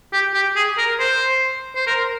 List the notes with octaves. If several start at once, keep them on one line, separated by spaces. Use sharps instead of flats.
G4
G4
G#4
A#4
C5
C5
A#4